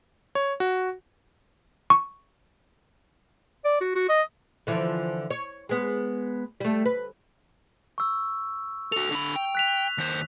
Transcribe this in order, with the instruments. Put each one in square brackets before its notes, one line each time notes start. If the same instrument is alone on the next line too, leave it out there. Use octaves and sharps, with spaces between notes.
[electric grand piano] C#5
F#4
[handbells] C#6
[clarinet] D5
F#4
F#4
D#5
[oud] D3 E3 F3
C#5
G#3 B3
G3 A3
B4
[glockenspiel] C#6 E6
[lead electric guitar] F#4 A4 [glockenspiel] F7
[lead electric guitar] D3 B5
G5
[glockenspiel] F#6 B6 F7
[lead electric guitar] D#2 C5